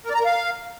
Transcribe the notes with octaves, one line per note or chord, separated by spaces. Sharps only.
A#4
D5
A#5
A#4
F5